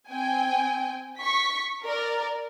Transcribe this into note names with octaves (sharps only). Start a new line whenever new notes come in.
C4 G5 G#5
C#6 B6
A#4 D5